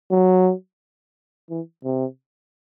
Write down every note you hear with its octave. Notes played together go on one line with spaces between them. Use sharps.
F#3
E3
C3